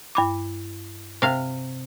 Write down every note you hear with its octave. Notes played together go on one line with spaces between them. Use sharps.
G2 B5 D6
C3 F5